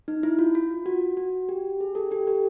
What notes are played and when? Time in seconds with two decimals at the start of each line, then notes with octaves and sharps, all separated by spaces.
0.08 D#4
0.23 E4
0.39 F4
0.55 F4
0.86 F#4
1.17 F#4
1.49 G4
1.81 G#4
1.95 G4 A4
2.11 G4 A4
2.27 G4 A4